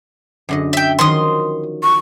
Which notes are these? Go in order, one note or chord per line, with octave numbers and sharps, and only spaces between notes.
F#2 D3 D#5
E5 G5
D#3 F3 F#3 C6 D#6
C#6